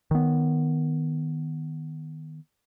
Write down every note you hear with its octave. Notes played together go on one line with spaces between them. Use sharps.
D#3 B3